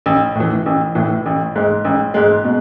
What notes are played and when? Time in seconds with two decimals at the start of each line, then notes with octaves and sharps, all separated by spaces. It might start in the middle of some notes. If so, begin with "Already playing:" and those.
0.06 A1
0.36 A2 E3
0.66 A1
0.95 A2 E3
1.26 A1
1.56 G#2 G#3
1.85 A1
2.14 G#2 G#3
2.44 B2